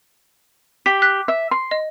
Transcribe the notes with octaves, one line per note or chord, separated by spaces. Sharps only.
G4 B6
F#6 B6
E5
C6
D#5